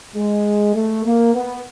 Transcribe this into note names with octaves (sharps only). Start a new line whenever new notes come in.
G#3
A3
A#3
B3